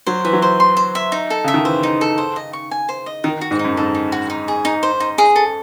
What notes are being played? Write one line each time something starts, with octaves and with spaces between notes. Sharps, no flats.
F#3 C5
E3 E5
F#3
C5
C6
C5
E5
D#4
A4
C#3 E5
D#3
E3 C5
D#4
A4
C5
D#5
C#6
G#5
C5
D#5
D#3 D#4
F#4
G#2
D#4
F#2
G#2 A4
D#4
F#4
D#4
G#4
D#4
C5
D#4
G#4
A4